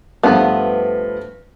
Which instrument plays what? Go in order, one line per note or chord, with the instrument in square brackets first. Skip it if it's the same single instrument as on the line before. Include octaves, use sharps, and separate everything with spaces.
[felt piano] G2 A3 F5 [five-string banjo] F3 B3